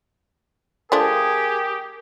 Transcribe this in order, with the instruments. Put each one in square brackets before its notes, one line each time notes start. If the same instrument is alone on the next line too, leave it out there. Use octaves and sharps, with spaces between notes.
[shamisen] F3 A3 D4 [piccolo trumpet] G4 [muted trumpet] G#4 [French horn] A#4